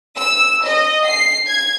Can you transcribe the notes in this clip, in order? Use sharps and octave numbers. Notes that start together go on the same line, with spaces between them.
E6
D#5
C7
G#6